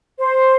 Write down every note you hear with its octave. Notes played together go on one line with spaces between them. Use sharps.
C5